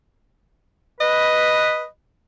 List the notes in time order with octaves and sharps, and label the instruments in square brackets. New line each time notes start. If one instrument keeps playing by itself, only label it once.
[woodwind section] B4 [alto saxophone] D#5